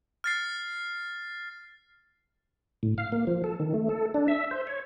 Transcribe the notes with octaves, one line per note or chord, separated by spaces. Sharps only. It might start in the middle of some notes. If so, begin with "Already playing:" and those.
F6 A6 C7
A2
F5
A#3
F3
A4
D#3
A3
A4
D4
E5
C5
C#5